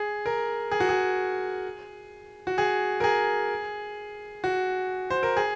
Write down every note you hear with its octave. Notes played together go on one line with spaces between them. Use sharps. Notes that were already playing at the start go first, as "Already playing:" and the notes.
Already playing: G#4
A#4
G#4
F#4
G#4
F#4
G#4
A#4
G#4
F#4
C5
A#4
G#4